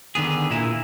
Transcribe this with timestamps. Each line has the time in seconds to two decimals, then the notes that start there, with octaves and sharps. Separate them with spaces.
0.15 D3 D#3 B3 G#4
0.51 A#2 A#3 E4